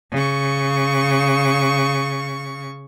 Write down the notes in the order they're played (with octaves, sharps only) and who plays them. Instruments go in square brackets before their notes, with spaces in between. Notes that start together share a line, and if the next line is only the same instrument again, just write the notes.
[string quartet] C#3 C#6